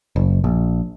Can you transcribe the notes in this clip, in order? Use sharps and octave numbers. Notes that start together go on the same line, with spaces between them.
F#1
A#1